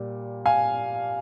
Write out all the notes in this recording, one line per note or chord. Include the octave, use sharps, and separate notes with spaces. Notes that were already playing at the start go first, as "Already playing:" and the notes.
Already playing: A#2 G3
F5 G#5